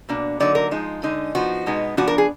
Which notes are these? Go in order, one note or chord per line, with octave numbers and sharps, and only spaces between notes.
B2 A#3 D4
D3 F#3 A#3 D#4 D5
A#4
F3 G#3 D#4
D3 G#3 D#4
F3 B3 D#4 F#4
B2 G#3 B3 D#4
F3 B3 D4 F#4
A#4
G#4